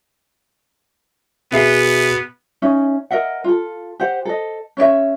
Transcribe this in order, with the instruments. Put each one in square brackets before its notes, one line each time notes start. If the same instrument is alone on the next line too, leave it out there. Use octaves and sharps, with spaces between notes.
[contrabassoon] B2 [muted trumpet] B3 [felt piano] G#4 E5 C7
[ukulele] C#4 D#4 E5
A#4 D#5 E5 F#5
F4 A4
G4 C5 F#5
A4 D#5
C#4 C#5 D5 E5